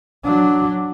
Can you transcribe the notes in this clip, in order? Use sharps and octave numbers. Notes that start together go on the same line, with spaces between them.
F#3 D4